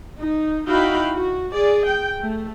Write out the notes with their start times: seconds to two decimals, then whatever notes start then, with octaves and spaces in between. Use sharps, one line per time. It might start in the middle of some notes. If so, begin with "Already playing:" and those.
0.20 D#4
0.67 D#4 E4 F#4 F5 G5 B5
1.13 F#4
1.52 G#4 D5
1.86 G5
2.21 A3